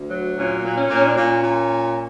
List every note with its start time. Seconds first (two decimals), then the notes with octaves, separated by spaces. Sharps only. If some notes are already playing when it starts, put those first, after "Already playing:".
Already playing: D2
0.09 F#3
0.36 A#2 C#4
0.63 A#2
0.77 C#4
0.90 A#2
0.96 C#4
1.04 D4
1.12 A#2 C#4
1.43 A#2